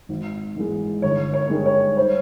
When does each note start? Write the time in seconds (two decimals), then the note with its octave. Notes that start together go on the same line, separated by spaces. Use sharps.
0.09 G#1
0.56 G#2 E3 G#3
1.02 G1 C#5
1.33 C#5
1.49 G2 D#3 G#3
1.66 C#5
1.97 C5